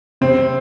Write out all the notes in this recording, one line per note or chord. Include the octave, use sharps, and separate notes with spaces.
C3 C4